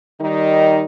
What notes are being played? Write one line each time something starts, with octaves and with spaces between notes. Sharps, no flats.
D#3 G3 D#4